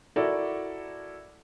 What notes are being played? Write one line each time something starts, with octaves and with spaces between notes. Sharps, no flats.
E4 F#4 A4 A#4 D5